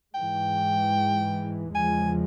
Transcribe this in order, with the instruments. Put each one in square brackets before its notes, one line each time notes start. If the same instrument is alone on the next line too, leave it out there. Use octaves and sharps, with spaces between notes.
[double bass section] G#2 E3 G#3 [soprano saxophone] G5
[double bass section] E2 C#3 F3 G#3 [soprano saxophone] G#5